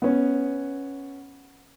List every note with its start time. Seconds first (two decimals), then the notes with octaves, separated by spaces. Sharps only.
0.02 B3 C#4